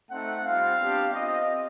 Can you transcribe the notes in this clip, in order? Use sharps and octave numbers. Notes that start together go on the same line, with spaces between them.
A3 C4 D#4 F#5
G3 C4 F4 F5
B3 D4 G4
C4 F4 D#5